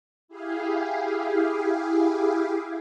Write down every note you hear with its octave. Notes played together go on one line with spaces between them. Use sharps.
E4 G4 G#4 F5